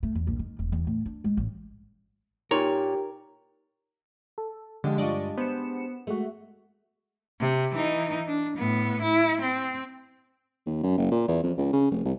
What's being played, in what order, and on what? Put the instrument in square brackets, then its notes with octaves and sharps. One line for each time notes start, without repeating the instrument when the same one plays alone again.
[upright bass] A3
E2
A#1
D#3
E1
E2
A2
D4
G#3
A1
[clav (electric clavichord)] A#2 C#5 [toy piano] D#4 C6 [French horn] G4 [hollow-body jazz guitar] A#4
[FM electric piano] A4
[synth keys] D3 F3 [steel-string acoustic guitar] G#3 D4 G4
[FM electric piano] G2 F4 [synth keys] D5 D#5 C#6
[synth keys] B3 E7 [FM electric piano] C5 C#7
[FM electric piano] G#3 F#4 [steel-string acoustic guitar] A3
[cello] C3
E3 D#4
D4
A2 B3
E4
C4
[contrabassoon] D#2
F#2
F#1
A#2
E2
F2
C#2
C#3
F1
C2